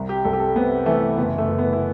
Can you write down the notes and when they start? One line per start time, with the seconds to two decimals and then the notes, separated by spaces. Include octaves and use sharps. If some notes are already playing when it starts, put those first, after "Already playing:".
Already playing: C2
0.09 G4
0.25 C2 A4
0.33 G4
0.40 A4
0.56 C3 B3
0.86 E3 A3
1.18 F#1 B3
1.38 A3
1.48 F#1
1.59 B3
1.73 E4